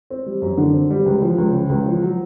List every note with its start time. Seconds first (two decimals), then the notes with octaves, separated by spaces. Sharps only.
0.10 C4
0.26 G3
0.42 F#2
0.58 D3
0.73 C4
0.90 G3
1.06 C#2
1.22 F3
1.38 C#2
1.53 C#3
1.69 C#2
1.86 F3
2.03 F#3